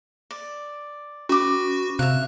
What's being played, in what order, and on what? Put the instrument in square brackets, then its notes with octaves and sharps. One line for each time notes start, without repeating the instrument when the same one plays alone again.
[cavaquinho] D5
[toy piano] C#4 [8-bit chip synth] F#4 [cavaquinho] B4 D6
[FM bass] C3 [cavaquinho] E5 F5 [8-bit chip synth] F#6